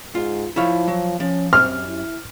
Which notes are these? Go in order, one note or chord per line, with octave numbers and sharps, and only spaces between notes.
G#2 F4
F3 E4 C#5 F5
F#3
F3 C#4
F#2 C4 G4 C6 F6
E4